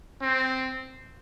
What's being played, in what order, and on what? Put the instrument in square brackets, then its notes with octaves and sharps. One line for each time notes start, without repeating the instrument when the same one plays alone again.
[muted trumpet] C4